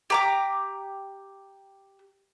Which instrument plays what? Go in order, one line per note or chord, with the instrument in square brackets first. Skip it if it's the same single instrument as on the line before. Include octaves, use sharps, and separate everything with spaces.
[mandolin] G4 A#5 D6